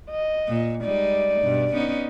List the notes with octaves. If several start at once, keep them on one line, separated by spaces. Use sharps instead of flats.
D#5
A#2
G3 G#3 D#4 D5
G2 B2
B3 C#4 D#4